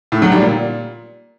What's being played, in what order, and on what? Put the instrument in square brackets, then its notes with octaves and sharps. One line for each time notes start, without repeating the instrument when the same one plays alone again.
[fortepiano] A2
F#3
G3
A#2